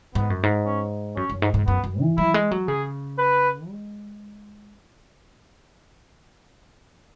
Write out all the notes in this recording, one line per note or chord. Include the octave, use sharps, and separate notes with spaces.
G#2 B3
F#2
G#2
C#4
F#2 C#4
F#2
G#2
G#2
F#2 B3
F#2
E3
F#3 E4
G#3
F#3
C#3 G#4
B4
G#3